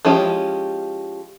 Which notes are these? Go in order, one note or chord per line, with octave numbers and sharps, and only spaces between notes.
F3 G#3 C#4 E4 G4